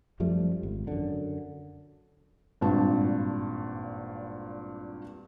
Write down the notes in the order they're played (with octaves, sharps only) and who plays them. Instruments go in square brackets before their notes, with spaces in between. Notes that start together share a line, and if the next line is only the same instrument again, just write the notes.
[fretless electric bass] F#2 F3 G3 A3
G#1
F#2 D3
[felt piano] G#1 G2 A#2 A5